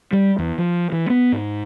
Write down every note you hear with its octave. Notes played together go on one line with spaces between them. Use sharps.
G3
E2
F3
E3
B3
G#2